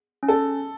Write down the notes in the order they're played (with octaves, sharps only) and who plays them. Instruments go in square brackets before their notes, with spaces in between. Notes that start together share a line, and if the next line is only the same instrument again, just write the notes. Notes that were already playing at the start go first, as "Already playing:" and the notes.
[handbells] C#4
[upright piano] A4